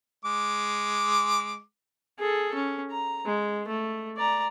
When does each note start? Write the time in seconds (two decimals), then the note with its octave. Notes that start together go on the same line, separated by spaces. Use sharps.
0.25 G#3 D6
2.19 G#4 A4
2.55 C#4
2.91 A#5
3.25 G#3
3.68 A3
4.17 D5 A#5